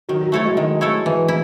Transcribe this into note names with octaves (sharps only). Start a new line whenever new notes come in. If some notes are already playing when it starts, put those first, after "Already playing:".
D#3 F#3
F#3
F#3 A3 E4 A4 C#5
G#3
D#3 G#3
A3 E4 A4 C#5
E3
E4